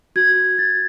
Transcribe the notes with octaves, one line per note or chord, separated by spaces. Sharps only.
F#4 G#6
F#4 A6